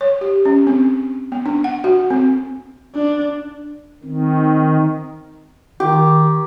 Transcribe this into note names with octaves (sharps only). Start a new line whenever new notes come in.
C#5
G4
C#4
C4
B3
D4
F#5
F#4
C4
D4
D#3 C4
D#3 G4